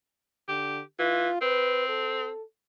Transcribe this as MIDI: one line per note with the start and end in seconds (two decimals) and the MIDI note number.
0.48 0.81 50
0.48 0.80 67
0.99 1.29 52
0.99 1.37 65
1.42 2.29 60
1.42 1.87 71
1.89 2.42 69